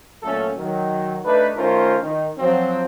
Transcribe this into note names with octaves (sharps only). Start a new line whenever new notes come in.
A#2 F#3 A3 C#4 A4
D#3 F#3
A3 D4 D#4 B4
D#3 A3 C#4 F4 A#4 C5
D#3
F3 F#3 C4